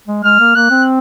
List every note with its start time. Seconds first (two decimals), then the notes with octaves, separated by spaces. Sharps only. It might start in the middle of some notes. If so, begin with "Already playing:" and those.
0.08 G#3
0.24 G#3 F6
0.40 A#3
0.55 A#3 F#6
0.71 C4